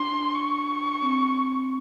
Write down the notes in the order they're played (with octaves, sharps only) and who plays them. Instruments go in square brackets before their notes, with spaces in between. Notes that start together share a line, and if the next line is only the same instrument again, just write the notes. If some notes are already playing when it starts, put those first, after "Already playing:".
Already playing: [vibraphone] D4 [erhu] C6
[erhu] C#6
[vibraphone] C4